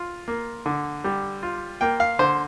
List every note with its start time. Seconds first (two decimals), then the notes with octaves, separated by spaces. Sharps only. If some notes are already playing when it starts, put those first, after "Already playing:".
Already playing: F4
0.28 A#3
0.66 D3
1.04 G3
1.43 F4
1.81 A#3 G5
2.00 F5
2.19 D3 C5